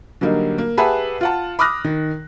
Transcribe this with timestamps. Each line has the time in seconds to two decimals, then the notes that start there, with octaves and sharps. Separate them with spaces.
0.21 D3 F#3 G3 A#3 D#4
0.58 A#3
0.77 G4 G#4 B4 E5 F#5 A5
1.21 F4 F#5 A5
1.59 B5 D6 D#6 F6 F#6 A#6
1.84 D#3